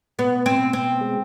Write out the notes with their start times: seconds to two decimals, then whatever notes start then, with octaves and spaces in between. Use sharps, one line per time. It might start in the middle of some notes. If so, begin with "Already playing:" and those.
0.19 B2 B3
0.46 C4
0.59 B2
0.73 C4
1.01 G#3